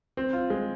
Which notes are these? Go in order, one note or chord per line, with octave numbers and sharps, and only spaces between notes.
C4
F4
G#3